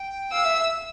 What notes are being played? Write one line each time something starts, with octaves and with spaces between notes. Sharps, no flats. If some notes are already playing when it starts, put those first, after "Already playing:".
Already playing: G5
F5 E6
E5